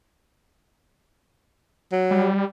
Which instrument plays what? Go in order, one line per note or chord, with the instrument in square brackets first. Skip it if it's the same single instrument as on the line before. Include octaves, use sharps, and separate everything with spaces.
[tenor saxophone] F#3
[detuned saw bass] G3